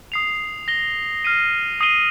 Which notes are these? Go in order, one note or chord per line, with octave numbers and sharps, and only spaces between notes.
D#6 C7 F7
A#6 G7
F6 C7 D#7
D#6 C7 D#7 G7